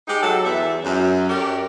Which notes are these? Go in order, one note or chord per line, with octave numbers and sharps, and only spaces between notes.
G#3 D#4 G4
F#3 A4
E2 E5
F#2
G4 A4 A#4 C#5 D5